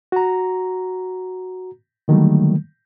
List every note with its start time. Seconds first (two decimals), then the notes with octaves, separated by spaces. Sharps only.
0.12 F#4 A#5
2.08 D3 D#3 F#3 G3 A3 A#3